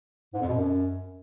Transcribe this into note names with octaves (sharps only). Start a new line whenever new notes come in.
G#2
F2
B2
F#2